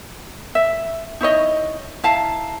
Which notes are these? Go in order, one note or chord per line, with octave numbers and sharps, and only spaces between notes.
E5
D#4 E4 C#5 D#5
E4 F5 A5 A#5